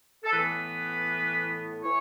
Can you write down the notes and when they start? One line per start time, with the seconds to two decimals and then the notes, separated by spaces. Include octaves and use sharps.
0.24 A4
0.32 A2 E3 B3 B4
1.84 E3 C#5